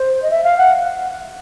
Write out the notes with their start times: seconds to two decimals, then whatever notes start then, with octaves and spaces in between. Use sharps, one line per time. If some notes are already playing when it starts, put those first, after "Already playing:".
Already playing: C5
0.22 D#5
0.31 E5
0.44 F5
0.58 F#5